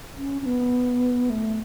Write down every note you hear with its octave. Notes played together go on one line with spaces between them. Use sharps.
C#4
C#4
B3
A3